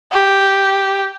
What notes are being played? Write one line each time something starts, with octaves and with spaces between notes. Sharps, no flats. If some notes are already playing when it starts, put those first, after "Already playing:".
G4